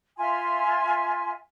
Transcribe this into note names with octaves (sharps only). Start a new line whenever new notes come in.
F4 E5 G#5 C6